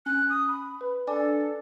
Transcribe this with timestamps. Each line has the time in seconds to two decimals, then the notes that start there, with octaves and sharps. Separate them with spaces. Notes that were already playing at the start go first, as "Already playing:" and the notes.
0.06 C#4 F#6
0.30 D#6
0.48 B5
0.81 B4
1.07 D4 A4 D5 G#5 D6